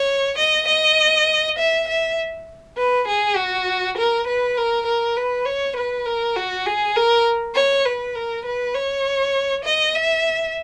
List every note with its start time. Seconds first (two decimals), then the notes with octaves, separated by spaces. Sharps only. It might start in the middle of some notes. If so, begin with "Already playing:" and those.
Already playing: C#5
0.38 D#5
0.68 D#5
1.58 E5
1.88 E5
2.77 B4
3.08 G#4
3.37 F#4
3.98 A#4
4.27 B4
4.57 A#4
4.86 A#4
5.17 B4
5.46 C#5
5.76 B4
6.06 A#4
6.36 F#4
6.66 G#4
6.96 A#4
7.55 C#5
7.85 B4
8.15 A#4
8.45 B4
8.75 C#5
9.65 D#5
9.95 E5